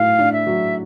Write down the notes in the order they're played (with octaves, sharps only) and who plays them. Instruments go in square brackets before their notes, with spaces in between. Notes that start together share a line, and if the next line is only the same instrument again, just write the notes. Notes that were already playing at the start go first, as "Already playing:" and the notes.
Already playing: [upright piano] A2 F#3 [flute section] F5
[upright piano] D4
[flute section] E5
[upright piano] F#3